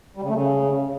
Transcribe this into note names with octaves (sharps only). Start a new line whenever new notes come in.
G3
C#3
A3
C#3